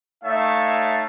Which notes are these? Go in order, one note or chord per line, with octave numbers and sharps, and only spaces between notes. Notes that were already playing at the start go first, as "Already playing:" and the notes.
A3 D#4 C#5 E5 F5 A5